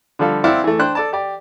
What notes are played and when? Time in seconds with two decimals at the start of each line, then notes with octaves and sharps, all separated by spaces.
0.19 D3 F3 G3 A4 F5
0.44 C4 E4 C5 D5 F5 F#5
0.64 E3 A3
0.79 D4 C5 G5 F#6
0.95 A4 D5 A5
1.13 G4 D5